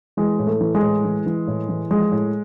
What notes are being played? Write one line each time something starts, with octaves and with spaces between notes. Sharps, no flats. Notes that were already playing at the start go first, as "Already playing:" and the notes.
E3 G#3
A2
A3
E3
G#3
A2
E3
E3
A2
E3
F3 G#3
A2